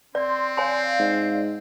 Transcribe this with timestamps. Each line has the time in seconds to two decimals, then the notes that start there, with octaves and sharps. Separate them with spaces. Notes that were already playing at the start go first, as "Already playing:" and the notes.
0.15 C4 D5 C6
0.57 C#5 D5 F5 G#5 C6
0.99 G#2